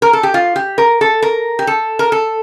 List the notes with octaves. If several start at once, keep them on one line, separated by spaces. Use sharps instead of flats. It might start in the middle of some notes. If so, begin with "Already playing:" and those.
A#4
A4
G4
F4
G4
A#4
A4
A#4
G4
A4
A#4
A4